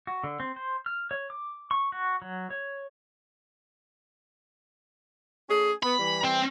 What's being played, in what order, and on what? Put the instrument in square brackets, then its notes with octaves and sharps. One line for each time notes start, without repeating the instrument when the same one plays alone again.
[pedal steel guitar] F#4
D3
C4
C5
F6
C#5
D6
C#6
F#4
F#3
C#5
[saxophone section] A3 C#4 G#4
[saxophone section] B3 [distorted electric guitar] B5
[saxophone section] E3 G3
[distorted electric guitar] C4